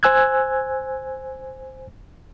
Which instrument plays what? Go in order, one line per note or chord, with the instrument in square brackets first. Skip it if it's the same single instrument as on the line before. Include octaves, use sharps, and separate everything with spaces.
[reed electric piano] C5 G#5 E6 F#6 G#6